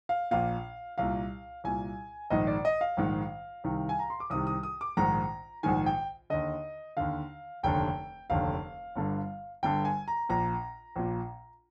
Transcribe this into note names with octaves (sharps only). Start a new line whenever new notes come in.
F5
A#1 A#2 F5
C2 A#2 F5
C2 A#2 G#5
A#1 G#2 D#3 D#5
D5
D#5
F5
A#1 G#2 D#3
C2 C3 D#3
G#5
A#5
C6
D6
C2 C3 D#3 D#6
D#6
D#6
D6
A#1 G#2 D#3 A#5
A#1 G#2 D#3 G#5
G5
D#2 D3 D#5
D#2 D3 F5
F1 D#2 D3 G5
F1 D#2 D3 F5
G1 G2 D3
G1 G2 D3 G5
G#5
A#5
A#1 A#2 A#5
A#1 A#2